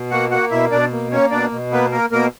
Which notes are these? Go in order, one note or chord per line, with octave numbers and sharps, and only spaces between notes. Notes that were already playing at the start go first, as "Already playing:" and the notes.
Already playing: B2
A#3 F#4 F#5
A#3 F#4 F#5
B2 E4 E5
B2 D4 D5
A#3
A#3 C#4 C#5
B2 D4 D5
B2
A#3 B3 B4
A#3 A#4
B2 A#3 A#4